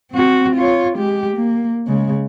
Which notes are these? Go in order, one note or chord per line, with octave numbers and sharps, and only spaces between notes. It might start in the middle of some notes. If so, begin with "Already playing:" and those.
C4 F#4
F4 C#5
G#3 G4
A#3
C#3 G#3